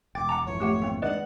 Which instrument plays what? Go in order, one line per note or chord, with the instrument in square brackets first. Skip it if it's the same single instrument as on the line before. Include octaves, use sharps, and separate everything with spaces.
[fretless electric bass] E1 [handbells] G5 A6 [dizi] D6
[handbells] F#5 A5 A#5
[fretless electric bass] G#1 F2 E3 [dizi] C#5
[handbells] A3 G4 F#5
A#3 C4
[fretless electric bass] D#3 G#3 D4 [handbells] B4 D5 D#5 [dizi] F#5